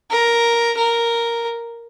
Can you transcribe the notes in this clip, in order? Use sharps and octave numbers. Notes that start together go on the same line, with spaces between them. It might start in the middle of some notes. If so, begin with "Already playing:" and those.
A#4
A#4